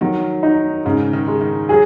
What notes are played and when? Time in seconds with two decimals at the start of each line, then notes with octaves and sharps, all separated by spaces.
0.01 D#3 F#3
0.43 D#4
0.85 G#2 C#3
1.13 D#3
1.27 G#3
1.41 D#3
1.69 F#3 G#4